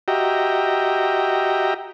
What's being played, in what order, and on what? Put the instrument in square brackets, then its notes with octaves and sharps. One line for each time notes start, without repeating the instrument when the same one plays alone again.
[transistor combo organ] F#4 G4 D#5 E5 G5 A#5